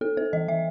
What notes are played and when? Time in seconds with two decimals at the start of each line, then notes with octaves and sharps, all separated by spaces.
0.01 B3 A4
0.17 B3 C5
0.33 E3 D#5
0.48 E3 E5